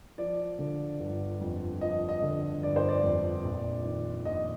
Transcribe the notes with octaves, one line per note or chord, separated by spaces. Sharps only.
F3 D5
D3
G1
F2
F3 D#5
D#5
D3
G1 D5
C5
D5
F2
A#1
D#3
A#1 D#5